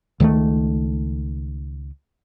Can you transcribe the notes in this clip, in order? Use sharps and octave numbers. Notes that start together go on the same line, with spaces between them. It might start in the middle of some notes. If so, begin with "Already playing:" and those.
C#2 D#3 F3 A3